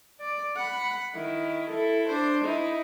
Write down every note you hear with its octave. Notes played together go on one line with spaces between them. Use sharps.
D5
F#5 B5
D#3 E4
E4 A4
D4 C5
D#4 E4